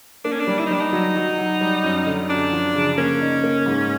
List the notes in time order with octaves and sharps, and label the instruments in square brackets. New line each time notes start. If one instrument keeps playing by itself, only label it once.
[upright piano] A#3 [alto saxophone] D4
[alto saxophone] C#4
D4
[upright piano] G3
[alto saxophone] E4
D#4
[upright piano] G3 [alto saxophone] D4
[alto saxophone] D#4
[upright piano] F#3
F#3
F#3
G3
F#2
D3
[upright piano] F#2 [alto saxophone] D4
[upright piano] F3
C#3
[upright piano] A#3 [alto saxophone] C#4
[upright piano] D#4
A#3
G#2